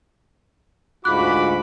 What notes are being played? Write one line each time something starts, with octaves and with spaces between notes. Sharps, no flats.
D2 G#2 F4 F#4 B5 D6 F#6